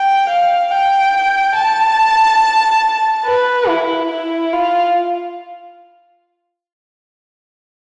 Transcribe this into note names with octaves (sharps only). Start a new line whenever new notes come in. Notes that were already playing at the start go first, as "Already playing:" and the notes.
Already playing: G5
F5
G5
A5
B4
E4
E4
F4